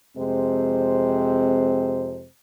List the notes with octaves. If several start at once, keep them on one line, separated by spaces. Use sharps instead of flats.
F2 C3 G#3 C4 C5